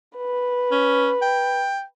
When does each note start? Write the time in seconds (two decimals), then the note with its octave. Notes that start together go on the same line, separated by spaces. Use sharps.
0.17 B4
0.71 C#4
1.22 G5